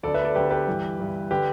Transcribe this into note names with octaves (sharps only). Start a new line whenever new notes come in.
D2 D3 A4 D5
B4 E5
A4 D5
D2 D3 G4 B4
G4 B4
G2 E3
G2 E3
D3 G4 B4